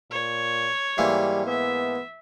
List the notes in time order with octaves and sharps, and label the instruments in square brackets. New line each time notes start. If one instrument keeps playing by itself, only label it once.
[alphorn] A#2 [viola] C#5
[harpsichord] G#2 E3 A#3 [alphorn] G3
[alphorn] B3 [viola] E5